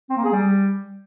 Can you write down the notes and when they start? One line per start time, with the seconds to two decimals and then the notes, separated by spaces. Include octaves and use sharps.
0.10 C4
0.17 A#3
0.25 G#4
0.32 G3